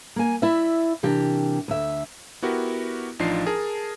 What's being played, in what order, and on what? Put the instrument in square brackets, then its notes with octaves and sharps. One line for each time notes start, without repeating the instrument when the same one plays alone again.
[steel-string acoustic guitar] A#3 G#5
E4 D5 E5
C3 E3 D4 G4 A#4
D2 E5
[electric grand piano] B3 E4 F#4 G4 A#4
A1 F3 D4 D#4 F4 C7
G#4 A#4 A5